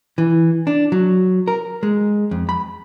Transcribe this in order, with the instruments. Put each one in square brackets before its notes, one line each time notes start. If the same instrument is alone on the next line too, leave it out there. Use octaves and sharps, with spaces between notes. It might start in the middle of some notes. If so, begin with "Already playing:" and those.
[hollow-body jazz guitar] E3
D4
F#3
A#4
G#3
F2
B5